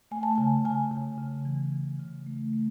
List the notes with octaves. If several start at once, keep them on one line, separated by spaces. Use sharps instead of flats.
A3 G#5
A5
C#3 G#5
C#3 G#5
C#3
C#3
E3
E3
C#3
A3
A3